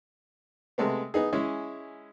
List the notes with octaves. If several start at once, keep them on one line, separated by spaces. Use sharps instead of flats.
C3 G#3 A3 B3
B3 D#4 G#4
G#3 C#4 E4